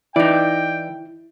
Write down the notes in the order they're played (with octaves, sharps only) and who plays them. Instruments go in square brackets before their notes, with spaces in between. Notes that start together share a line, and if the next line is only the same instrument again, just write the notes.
[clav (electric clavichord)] E3 [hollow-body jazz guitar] D#4 D5 [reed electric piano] E4 [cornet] G5